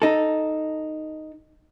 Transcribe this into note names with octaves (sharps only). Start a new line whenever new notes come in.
D#4 A4